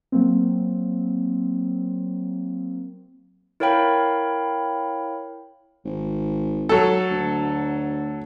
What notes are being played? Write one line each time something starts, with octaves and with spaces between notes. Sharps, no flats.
F#3 A#3 C4
E4 A#4 C#5 F5 G5 B5
G#1
F#3 A4
D2